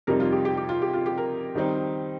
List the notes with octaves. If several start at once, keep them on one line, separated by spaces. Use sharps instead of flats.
F2 C3 G3 D#4 A#4
F4
G4
G4
G4
F4
G4
F4
G4
A#4
D#3 G3 C4 D#4